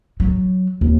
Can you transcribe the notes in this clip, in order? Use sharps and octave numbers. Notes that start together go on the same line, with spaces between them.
F#3
D#2